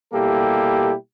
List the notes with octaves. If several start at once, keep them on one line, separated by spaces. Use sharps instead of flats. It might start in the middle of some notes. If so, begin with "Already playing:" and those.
B2 G3 A#3 E4 G4 A4